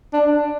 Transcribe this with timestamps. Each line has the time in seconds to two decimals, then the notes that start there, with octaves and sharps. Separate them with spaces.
0.13 D4